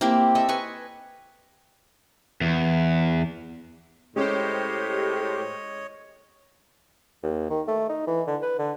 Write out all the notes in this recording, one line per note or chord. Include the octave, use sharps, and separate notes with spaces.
A#3 C4 E4 G4
A4 D#5 E5
B4 D#5 G#5 C#6
E2
A2 G#3 C#4 G4 C5 C#5 D#5
D#2
D#3
A3
D#4
E3
D3
B4
D3